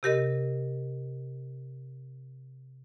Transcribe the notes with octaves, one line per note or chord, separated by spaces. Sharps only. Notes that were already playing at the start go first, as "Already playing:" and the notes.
C3 G4 A#4 D#5